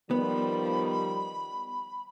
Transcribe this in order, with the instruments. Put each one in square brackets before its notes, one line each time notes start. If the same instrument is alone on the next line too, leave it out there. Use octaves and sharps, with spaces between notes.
[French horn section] D#3 F3 G3 [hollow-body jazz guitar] B3 [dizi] B5